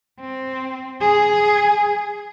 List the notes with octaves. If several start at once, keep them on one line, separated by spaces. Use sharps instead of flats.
C4
G#4